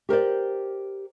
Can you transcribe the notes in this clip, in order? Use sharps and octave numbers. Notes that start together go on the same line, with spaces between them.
G4 A#4 C5 D5